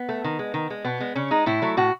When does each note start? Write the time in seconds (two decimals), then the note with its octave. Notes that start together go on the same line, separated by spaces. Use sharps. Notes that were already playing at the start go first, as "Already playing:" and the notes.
Already playing: B3
0.09 A3
0.24 D#3
0.39 G#3
0.54 D#3
0.70 G#3
0.85 B2 B3
1.00 G#3
1.15 C#3 C#4
1.31 G#3 D#4
1.46 A2 E4
1.62 F#3 A3
1.77 A2 F#4